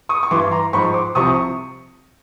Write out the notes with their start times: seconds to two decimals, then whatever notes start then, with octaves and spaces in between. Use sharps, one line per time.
0.09 C#6 D#6
0.23 C#6
0.31 G2 E3 C6 D6
0.51 A#5 C6
0.73 G#2 B5 C#6
0.76 F3
0.94 C6 D6
1.15 C2 C3 F3 C#6 D#6